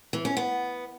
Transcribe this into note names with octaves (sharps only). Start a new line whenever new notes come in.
E3
C#4
B3